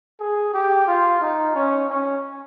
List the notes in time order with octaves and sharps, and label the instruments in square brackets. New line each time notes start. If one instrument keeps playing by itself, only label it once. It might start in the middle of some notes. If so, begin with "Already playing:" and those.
[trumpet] G#4
G4
F4
D#4
C#4
C#4